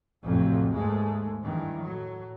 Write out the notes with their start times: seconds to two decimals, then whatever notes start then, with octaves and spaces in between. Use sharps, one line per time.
0.23 A1 F2 C3 F#3
0.72 D#2 G#2 G#3 A3
1.40 G2 D#3 E3
1.80 A2 F#3